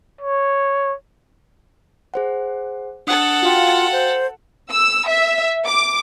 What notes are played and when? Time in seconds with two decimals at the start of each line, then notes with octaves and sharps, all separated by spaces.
0.21 C#5
2.14 G#4 C5 F#5
3.07 D4 A4 F#5 D#6 F#6
3.43 F4 F#4 F5 G5
3.92 C5
4.70 E6
5.07 E5
5.66 D6